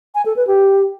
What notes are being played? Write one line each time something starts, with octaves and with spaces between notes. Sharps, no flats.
G#5
A4
B4
G4